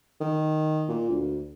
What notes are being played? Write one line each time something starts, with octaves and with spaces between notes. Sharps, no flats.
D#3
A#2
D2